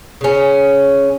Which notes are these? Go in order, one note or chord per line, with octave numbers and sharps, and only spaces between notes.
C#3 C#4